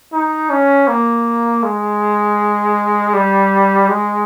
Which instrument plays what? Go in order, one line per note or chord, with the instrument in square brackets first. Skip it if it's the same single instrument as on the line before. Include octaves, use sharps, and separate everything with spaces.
[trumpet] D#4
C#4
A#3
G#3
G3
G#3